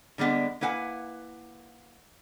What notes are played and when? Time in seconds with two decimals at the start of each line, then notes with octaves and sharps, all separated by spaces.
0.18 D3 G3 G#3 B3 D4
0.61 A#3 E4 B4 F#5 G#5